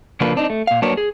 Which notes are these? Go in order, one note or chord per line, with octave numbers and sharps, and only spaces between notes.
C#3 F3 A#3 D4 F4 B4
C4 D4 D#4
A3
A#2 F5
F#3 A#3 D4 A#4 B4 C#5
G#4